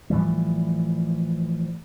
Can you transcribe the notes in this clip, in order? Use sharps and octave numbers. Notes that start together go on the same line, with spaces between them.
A2 E3 F3 G3